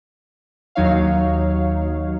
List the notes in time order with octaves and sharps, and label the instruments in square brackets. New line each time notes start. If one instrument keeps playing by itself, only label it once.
[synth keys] D#2 F#3 D#4 C#5 F5